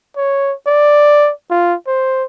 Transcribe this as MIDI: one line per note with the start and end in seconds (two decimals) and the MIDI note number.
0.17 0.54 73
0.67 1.31 74
1.50 1.75 65
1.87 2.25 72